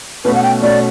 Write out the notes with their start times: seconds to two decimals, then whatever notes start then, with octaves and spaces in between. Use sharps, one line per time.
0.25 B2 A3 C#4 F#4 B4
0.34 F#5
0.43 G5
0.62 B2 A3 C#4 F#4 D5